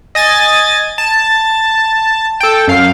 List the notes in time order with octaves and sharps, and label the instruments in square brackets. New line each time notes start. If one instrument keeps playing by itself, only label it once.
[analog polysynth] D#5 G#5 A6
A5
A4 G5
F#2 F5